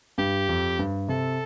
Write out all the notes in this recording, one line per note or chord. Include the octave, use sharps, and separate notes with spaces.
G2 G4
F2
G2
C3 A4